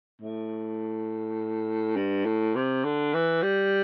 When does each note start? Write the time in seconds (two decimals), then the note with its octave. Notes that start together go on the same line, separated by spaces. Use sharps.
0.21 A2
1.96 G2
2.26 A2
2.55 C3
2.84 D3
3.14 E3
3.42 G3